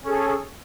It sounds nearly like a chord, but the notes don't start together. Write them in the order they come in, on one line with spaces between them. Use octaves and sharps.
C#4 A4 G#4